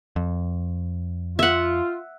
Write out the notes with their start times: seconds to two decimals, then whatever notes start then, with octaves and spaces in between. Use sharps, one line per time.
0.16 F2
1.39 F4 E5 F#5